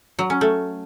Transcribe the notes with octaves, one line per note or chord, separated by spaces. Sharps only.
F#3
C#4
A3